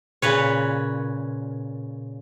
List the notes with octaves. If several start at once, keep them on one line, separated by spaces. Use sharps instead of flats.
A#2 C#3 B4 C#5